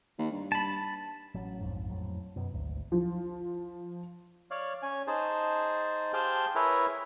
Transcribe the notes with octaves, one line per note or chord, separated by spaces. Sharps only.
D#2
G2
A5 B5
A1 F#3 C#4
A#1 F2 G#2
F2 A2 F#3
F#2 B2
G#1 D2
F3
C#5 D5 F5
C#4 G#5
D#4 G#4 C5 A5
G4 G#4 C5 F5 G5 A5
E4 G#4 A#4 B4 C#5 E5